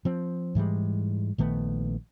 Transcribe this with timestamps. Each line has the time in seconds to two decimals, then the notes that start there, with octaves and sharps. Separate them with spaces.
0.05 F3 C4
0.55 G#2 E3 G3 G#3
1.38 A#1 D#3 A3 B3